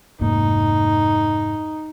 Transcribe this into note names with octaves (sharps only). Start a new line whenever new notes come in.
F1 G#2 A#3 D#4